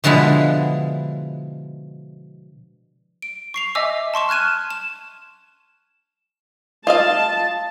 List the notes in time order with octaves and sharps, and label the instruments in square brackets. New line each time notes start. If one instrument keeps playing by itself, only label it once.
[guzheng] B2 D3 F3 G#3 E4
[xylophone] D7
C#6 C7 F7
D#5 E5 G#5 D6 E6
A5 C6 C#6 E7
F6 F#6 G#6 D#7 E7
E7
[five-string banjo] F4 D#5 F5 [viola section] A5